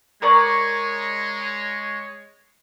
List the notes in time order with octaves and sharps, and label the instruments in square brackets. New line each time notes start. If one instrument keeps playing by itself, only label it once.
[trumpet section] G#3 C#5 [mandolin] A#4 D5 C#6